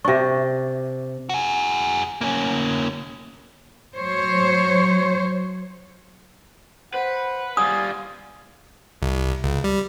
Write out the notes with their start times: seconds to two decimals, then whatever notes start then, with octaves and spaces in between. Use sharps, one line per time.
0.05 C3 D4 E5 C#6
1.29 F#4 G#4
2.21 A#3 C#4
3.95 F#3 C5 C#5
6.94 B4 C5 F#5
7.57 G3 F4 G#5 D#6
9.02 C2
9.44 C#2
9.64 G3